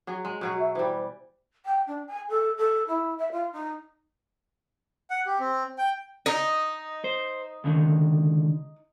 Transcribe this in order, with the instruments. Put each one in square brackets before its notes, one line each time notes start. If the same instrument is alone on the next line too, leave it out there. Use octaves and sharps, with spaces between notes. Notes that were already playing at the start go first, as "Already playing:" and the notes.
[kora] F#3 G#4
G#3
[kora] B2 F#3 G#4 [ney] F#4
[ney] E5
[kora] E3 G3 [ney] C5
[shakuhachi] G5
D4
G#5
A4
A4
E4
E5
F4
D#4
[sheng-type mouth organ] F#5
G4
C4
G5
[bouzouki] D#4
[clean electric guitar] C5
C#2 D3 D#3